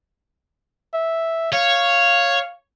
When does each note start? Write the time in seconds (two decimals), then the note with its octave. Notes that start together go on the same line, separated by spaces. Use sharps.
0.94 E5
1.53 C#5 F5